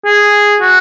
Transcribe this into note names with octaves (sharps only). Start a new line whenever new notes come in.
G#4
F#4